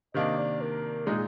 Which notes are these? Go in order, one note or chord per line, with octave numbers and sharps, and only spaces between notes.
C3 D#3 A#3 D4 D#5
D5
A#4
A#2 G#3 D#4 G#4